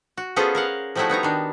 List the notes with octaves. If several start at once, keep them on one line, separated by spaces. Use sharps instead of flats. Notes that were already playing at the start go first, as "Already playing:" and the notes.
F#4
B3 C#4 F4 G#4 A4 C5
A#4 F5 F#5
F3 G3 A3 D#4 E4 F#4
B3 D#4 C#5 A#5
D#3 D4